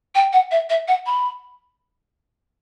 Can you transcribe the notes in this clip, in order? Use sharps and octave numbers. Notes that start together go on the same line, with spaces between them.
G5
F#5
E5
E5
F#5
B5